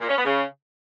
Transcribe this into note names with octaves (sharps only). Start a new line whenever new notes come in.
A#2
C#4
B3
C#3